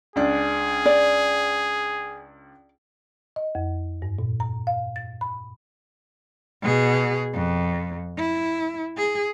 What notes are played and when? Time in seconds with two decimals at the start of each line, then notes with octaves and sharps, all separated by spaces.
0.16 C#2 D4 G#4
0.86 D5
3.36 D#5
3.55 F2
4.02 G2
4.19 A#2
4.40 A#5
4.67 F5
4.96 A6
5.21 B5
6.62 B2 G#4
7.34 F2
8.18 E4
8.97 G#4